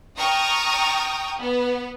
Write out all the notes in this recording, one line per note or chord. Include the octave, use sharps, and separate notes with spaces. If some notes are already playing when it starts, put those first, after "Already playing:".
G5 A5 A#5 C#6 D#6 F6
B3